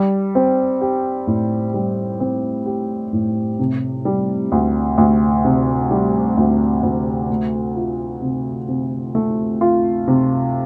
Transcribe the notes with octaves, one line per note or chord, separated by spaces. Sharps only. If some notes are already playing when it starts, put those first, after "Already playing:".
Already playing: G3
C4
G4
A2
G3
C4
G4
A2
C3
G3
D2
D2
C3
G3
D2
D2
A3
F4
C3
C3
A3
F4
C3